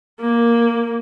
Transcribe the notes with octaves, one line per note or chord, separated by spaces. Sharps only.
A#3